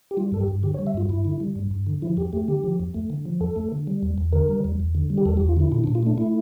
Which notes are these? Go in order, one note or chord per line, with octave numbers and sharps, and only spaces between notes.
G4
G3 F4
G2 A4
G4
G2
D3 G4
C#5
G3
E5
G2 F4
G2 E4
D3
G3
G2
G2
D3
F3 E4
F2 G4
A3 G4
D3 G4
F3
F2
A3
D3
F3
F2 A4
A3
D3
G3
E2
E2
D3 A#4
G3
E2
E2
D3
G3
G4
E2 A4
G4
E2
F4
D3 E4
A#2 E4
D4
A#2
F4
A3 D4
A3 E4